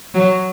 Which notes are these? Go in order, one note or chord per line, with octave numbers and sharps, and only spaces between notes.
F#3